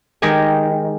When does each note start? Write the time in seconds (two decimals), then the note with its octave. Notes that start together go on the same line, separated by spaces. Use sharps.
0.22 D#3 G#3 D#4 G4 G#5